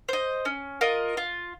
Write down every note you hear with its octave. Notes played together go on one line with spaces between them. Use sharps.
C5 D#5
C#4
F4 A#4 D#5
F4